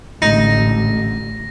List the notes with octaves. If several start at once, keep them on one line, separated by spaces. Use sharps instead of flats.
A1 D3 G#3 A3 D#4 A#6